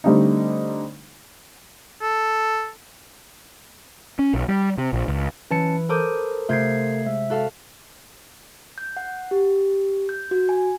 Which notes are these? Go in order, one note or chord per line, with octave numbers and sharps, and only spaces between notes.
D3 G3 A3 C4 D#4
A4
C#4
B1
G3
C3
A#1
C#2
E3 C#4 B4 A5 C#7
A4 A#4 C5 D6 D#6 G6
C3 A3 F4 G6 G#6 C7
G#3 E5
F#4 A4 F5
G6
F#5
G4
G6
F#4
G#5